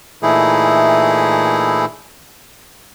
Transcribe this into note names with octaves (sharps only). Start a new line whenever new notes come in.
A#2 E3 A3 D#4 E4 G#4